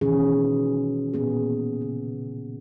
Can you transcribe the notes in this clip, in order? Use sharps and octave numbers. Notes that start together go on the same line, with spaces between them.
B2 D#3 E3 C#4 G#4
A#2 B3 G#4
C#3